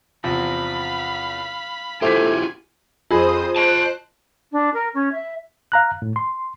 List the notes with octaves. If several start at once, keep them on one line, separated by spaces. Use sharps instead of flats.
E2 C3 F3 F5 B5
A3 E4 F4 G4 C5 G#5 D6 B6
F2 F4 G#4 C5 B5 D#6
C5 D#5 A5 F#6
D4
A#4
C#4
E5
F5 A#5 F#6
A2
C6